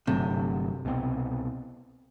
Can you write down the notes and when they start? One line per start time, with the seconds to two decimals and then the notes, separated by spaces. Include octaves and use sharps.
0.07 G1 G2 C3 F#3 A3
0.85 C2 B2 G3 C4